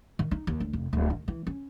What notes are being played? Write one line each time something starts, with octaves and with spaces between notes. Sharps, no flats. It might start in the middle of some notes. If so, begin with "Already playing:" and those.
D#3
D#4
D#2
D2
F1
D1
D#3
E3
C#4